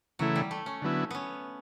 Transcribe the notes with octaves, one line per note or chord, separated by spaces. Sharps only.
C#3 E3 F#3 A3 E4
G3
A3
C#4
D3 F#3 B3 E4
B3 C#4